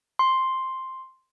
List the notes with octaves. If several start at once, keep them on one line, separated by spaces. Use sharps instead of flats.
C6